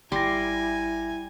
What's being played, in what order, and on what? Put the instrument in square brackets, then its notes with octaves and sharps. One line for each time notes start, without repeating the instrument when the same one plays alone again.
[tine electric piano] G#1 A#6 [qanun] G3 C6 D6 [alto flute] E4 [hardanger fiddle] G#5